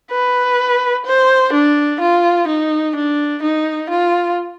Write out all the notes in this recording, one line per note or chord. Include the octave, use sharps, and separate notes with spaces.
B4
C5
D4
F4
D#4
D4
D#4
F4